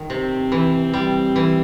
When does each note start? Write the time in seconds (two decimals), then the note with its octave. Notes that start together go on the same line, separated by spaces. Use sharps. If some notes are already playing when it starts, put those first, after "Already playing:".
Already playing: D#3
0.10 C3 C4
0.52 E3
0.93 G3
1.36 E3